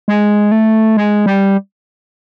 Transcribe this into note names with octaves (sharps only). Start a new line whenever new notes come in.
G#3
A3
G#3
G3